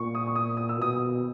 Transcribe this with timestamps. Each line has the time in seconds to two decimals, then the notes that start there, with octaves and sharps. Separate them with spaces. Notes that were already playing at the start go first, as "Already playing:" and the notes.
Already playing: A#2 C#6
0.15 D#6
0.27 C#6
0.35 D#6
0.57 D#6
0.69 E6
0.78 B2 D#6